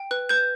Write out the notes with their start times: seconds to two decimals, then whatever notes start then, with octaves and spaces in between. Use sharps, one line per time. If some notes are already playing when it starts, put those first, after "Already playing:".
Already playing: G5
0.11 B4 F#6
0.29 B4 G6